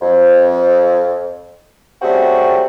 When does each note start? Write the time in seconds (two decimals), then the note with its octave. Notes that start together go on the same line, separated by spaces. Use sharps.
0.02 F2
2.02 C#3 G3 A3 C4 F#4 G4